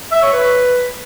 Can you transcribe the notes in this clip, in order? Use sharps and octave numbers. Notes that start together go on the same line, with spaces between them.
E5
C#5
B4